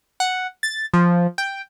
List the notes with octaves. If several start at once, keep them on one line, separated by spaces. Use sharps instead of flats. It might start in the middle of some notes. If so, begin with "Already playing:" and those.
F#5
A6
F3
G5